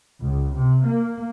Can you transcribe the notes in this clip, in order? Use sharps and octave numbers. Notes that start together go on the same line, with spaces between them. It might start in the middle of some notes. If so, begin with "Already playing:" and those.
C#2
C3
A#3